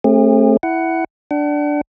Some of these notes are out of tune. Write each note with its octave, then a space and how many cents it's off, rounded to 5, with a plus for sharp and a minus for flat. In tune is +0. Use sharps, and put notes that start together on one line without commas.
A3 +0 C4 +40 G#4 -45
E4 +0 F#5 +10
D4 +0 F#5 +40